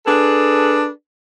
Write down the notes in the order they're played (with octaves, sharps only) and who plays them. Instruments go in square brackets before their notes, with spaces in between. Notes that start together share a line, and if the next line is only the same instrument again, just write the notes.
[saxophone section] D4 G#4 A4 B4